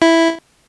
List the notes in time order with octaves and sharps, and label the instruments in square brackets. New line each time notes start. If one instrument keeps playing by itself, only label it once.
[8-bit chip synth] E4